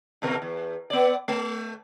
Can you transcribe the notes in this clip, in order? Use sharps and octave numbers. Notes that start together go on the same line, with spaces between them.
E2 B2 A#4
E2
B3 D5
A3